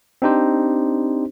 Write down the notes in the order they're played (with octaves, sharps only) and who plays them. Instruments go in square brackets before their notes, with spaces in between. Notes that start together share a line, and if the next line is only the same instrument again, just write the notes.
[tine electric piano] C4 D4 D#4 G4 C5